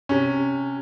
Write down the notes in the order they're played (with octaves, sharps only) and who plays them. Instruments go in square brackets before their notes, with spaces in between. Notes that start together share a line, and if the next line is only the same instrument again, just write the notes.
[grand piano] C3 C#4